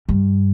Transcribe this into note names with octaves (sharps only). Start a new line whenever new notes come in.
G2